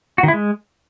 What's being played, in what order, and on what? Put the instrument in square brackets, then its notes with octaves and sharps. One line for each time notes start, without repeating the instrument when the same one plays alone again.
[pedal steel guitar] F#4
D#3
E4
G#3